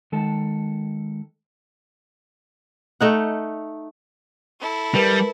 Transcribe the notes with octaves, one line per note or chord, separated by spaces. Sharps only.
D#3 G#3 A4 A5
A3 D#4 F#5
E4 A4
G3 A#4 B4